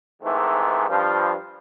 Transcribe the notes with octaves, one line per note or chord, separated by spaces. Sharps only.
G#2 C3 D#3 E3 A3
G2 F3